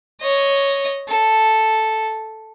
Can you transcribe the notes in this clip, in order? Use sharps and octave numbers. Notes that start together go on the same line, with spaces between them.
C#5 D#5
A4